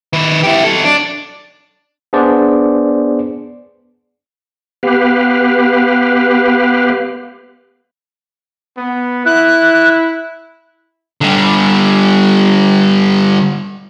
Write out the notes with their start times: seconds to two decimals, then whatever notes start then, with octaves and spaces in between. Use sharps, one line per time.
0.13 D#3 B4
0.43 E4 G4
0.64 F#3 A4
0.85 D4
2.13 B3 D4 G#4 C5 D5
4.83 B3 G4 B4 F5
8.77 B3
9.26 E4 F#6
11.21 D3 G3